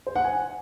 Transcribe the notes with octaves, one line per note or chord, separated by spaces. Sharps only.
C5
F#5
G#5